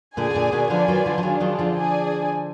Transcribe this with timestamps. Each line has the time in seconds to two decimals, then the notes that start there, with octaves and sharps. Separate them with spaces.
0.17 A#2 D3 G#4 D5 G#5
0.30 B2
0.34 A#2 D3
0.52 B2 D#3
0.70 D3 F3 F4 B4 D5 G#5
0.88 D#3 F#3
1.05 D3 F3
1.18 F3
1.23 D#3 F#3 D4 F4 G#4
1.40 D#3 F#3
1.59 D3 F3
1.76 D4 G#4 D5 G#5